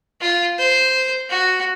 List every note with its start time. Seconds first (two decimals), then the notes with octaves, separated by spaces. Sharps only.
0.21 F4
0.58 C5
1.29 F#4